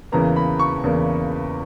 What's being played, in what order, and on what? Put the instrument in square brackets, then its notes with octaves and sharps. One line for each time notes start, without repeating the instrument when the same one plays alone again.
[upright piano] E2 C#3 E3 A#3 A#5
B5
C#6
E2 C#3 E3 A#3